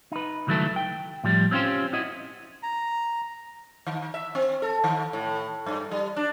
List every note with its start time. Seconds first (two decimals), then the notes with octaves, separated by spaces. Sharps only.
0.12 D#4 B4
0.47 C#2 D#3 F#3 A3 E4 A4
0.76 G5
1.24 A2 F3 G3
1.51 C4 C#4 F4 G4 C5
1.93 E4 F#4 D#5
2.63 A#5
3.86 D#3
4.14 E5
4.35 C4
4.62 A4
4.84 D#3
5.13 A2
5.66 G2
5.91 G3
6.16 D4